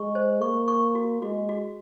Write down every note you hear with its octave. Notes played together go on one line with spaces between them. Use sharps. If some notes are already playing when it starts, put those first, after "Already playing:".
Already playing: G#3 C#6
C5
A#3 C#6
C#6
F#4
G#3 F#4
F#4